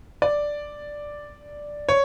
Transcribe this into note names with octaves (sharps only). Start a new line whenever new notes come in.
D5
C#5